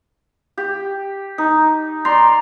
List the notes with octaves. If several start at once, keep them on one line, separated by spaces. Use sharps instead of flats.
G4
D#4
D5 A#5 C6